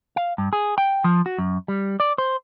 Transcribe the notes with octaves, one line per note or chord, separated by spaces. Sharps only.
F5
G2
G#4
G5
F3
F#4
F#2
G3
D5
C5